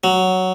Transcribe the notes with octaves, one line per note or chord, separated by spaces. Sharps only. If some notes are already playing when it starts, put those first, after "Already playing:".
F#3